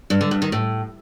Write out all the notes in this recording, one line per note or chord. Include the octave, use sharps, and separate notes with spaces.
G2
D3
G2
D#3
A2